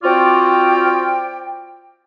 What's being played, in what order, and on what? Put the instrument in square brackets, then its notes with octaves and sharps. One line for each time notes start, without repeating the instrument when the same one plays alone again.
[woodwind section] C4 F4 F#4 D5 F5 G5